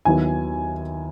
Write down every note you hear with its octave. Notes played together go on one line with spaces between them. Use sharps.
D#2 D#3 F#3 B3 E4 G#5